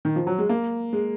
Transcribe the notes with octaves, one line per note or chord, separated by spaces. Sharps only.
D#3
F3
F#3
G#3
A#3
G#3